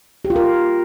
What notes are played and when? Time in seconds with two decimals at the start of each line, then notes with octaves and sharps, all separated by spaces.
0.25 G4
0.30 F4
0.36 A#4